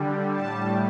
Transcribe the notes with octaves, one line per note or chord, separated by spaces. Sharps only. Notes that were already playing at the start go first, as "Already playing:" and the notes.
Already playing: D3 G3
A2 G3 A5